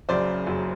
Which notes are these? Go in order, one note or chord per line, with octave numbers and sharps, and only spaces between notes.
F#1 F#2 C#3 F#3 C5 D5
F#1 F#2 C#3 F#3